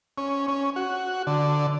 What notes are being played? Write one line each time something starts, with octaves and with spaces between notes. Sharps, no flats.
C#4
C#4
F#4
D3